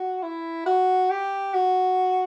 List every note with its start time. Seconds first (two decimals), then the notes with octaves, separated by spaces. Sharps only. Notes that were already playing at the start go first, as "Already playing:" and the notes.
Already playing: F#4
0.23 E4
0.66 F#4
1.11 G4
1.54 F#4